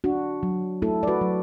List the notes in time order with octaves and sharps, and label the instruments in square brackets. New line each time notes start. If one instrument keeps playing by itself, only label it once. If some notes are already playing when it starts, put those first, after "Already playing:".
[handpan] D4 F#4
F#3
A3 E4 A4
D5
F#4 B4
F#3